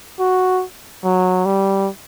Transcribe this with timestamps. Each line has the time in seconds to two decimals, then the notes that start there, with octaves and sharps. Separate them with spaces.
0.20 F#4
1.04 F#3
1.45 G3